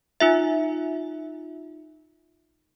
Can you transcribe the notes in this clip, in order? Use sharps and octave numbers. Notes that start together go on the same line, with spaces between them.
D#4 F4 E5